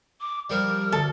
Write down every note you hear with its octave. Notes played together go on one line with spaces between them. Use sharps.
D6
F3 G3 A#4
D2 A4 A5